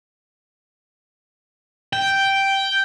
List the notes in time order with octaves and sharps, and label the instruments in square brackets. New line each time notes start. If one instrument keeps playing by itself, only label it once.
[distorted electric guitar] G5